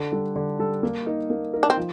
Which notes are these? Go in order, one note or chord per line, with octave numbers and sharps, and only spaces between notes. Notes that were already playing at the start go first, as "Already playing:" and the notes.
Already playing: D3
G3 D4 A4
D3
G3 D4 A4
A#3
D#4 A#4
A#3
D#4 A#4
D4
C4
F3